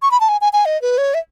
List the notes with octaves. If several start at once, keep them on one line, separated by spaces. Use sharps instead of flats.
C#6
B5
A5
G#5
G#5
G#5
D#5
B4
C#5
E5